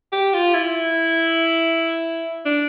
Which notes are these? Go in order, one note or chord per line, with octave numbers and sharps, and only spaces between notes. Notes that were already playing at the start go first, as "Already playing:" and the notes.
G4
F4
E4
D4